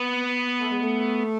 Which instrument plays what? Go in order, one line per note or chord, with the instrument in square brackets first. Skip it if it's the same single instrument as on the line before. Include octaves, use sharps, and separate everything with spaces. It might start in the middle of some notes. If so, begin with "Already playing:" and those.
Already playing: [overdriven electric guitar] B3
[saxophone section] A3
G#3
A3